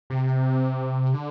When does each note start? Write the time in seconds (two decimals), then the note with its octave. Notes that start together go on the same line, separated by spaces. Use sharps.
0.10 C3
1.14 D3